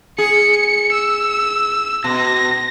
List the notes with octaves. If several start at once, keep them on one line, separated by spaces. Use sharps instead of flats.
G#4 C#7
E6
B2 A#6